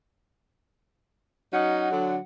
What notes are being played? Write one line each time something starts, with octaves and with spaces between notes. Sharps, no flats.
F#3 C#4 D#4 F#5
D3 F#3